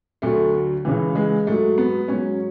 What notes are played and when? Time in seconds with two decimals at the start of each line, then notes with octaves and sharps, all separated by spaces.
0.22 D2 D3 F#3 A3
0.85 C#2 C#3 E3
1.15 G#3
1.47 G#2 F#3 A3
1.78 B3
2.08 G#2 F#3 C#4